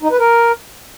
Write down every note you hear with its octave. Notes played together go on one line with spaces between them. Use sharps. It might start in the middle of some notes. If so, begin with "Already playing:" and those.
D#4
B4
A#4